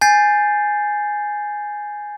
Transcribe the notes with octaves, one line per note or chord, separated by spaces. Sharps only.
G#5 G6 A6 C7